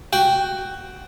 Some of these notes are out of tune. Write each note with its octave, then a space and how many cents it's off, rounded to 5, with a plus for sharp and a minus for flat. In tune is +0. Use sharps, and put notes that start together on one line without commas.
F#4 +10 G5 +0